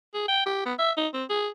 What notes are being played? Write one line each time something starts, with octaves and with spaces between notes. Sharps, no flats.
G#4
G5
G4
B3
E5
D#4
C4
G#4